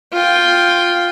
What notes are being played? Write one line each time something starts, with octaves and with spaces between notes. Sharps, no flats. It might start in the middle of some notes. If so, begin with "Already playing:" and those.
F4 G5